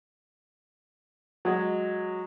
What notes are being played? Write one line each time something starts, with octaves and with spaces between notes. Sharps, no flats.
F#3 G#3